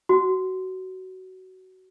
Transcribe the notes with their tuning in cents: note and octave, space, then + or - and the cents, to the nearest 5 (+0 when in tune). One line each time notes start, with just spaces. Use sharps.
F#4 +20